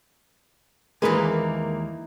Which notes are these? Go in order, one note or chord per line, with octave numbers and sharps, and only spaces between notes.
D#2 E3 G#3 A#3 D#4 G#4 B4